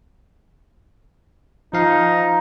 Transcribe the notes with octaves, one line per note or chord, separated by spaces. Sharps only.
F3 D#4 F5